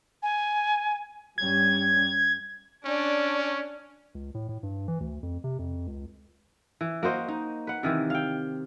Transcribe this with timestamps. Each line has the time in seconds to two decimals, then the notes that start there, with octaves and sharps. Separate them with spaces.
0.23 G#5
1.38 G2 G3 C#4 G#6
2.85 C#4 D4 D5
4.15 C#2
4.34 A2
4.49 A2
4.63 G2
4.88 E3
5.00 D2
5.23 F2
5.44 C3
5.59 F2
5.87 C#2
6.81 E3
7.03 A#3 F#4 C5 D#5
7.28 D#4
7.67 B4 F#5
7.83 C3 D#3 E3
8.10 F5 G5